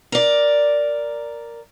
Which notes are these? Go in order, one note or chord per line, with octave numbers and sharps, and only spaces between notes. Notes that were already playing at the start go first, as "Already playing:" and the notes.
A#4 D5